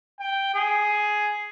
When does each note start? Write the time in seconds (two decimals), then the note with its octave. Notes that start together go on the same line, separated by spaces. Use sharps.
0.20 G5
0.55 G#4